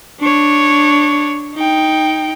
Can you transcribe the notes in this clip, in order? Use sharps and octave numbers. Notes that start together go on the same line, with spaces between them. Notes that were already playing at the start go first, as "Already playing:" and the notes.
D4 C#5
D#4 G5